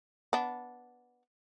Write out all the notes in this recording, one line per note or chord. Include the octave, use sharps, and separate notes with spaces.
B3 D4